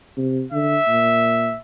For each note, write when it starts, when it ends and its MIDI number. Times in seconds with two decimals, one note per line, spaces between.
0.18 0.43 48
0.52 0.77 50
0.52 1.60 76
0.88 1.55 46